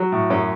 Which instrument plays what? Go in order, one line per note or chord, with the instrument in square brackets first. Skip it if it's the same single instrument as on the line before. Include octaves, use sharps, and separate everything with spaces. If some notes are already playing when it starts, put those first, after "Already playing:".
Already playing: [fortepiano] F#3
A2
F#2 C#4